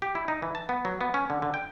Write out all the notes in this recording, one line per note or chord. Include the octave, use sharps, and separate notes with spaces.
G4
E4
D#4
E3
A5
B3
F#3
B3
C#4
D3
D3
G5